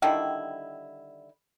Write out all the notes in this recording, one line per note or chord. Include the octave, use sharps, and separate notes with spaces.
D3 D#3 G3 E4